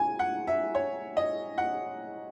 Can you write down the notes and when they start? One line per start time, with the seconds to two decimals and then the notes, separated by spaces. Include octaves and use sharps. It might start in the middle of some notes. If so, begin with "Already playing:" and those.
Already playing: G#5
0.19 F#5
0.47 E5
0.75 C#5
1.17 D#5
1.58 F#5